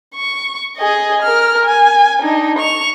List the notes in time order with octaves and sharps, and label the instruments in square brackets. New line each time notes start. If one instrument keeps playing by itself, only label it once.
[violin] C#6
G#4 D#5
A#4 F6
G#5
D4 D#4
C#6 F7